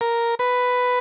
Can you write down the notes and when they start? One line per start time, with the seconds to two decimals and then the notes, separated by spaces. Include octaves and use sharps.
0.01 A#4
0.39 B4